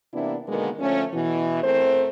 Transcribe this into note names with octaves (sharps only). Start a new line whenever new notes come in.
C3 E3 A#3 B3 D4 E4
B2 D3 D#3 G#3 A#3 B3
D3 F3 A3 C#4
B2 E3
E2 A3 C4 A#4 C5